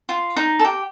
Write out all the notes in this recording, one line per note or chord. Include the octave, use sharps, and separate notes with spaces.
F4
D#4
A4
G4